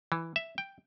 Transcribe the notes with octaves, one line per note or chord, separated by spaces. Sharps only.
E3
E5
G5